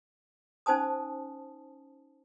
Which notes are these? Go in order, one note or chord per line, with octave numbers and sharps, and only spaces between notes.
C#4 D#4 C5 G#5 A5 D#6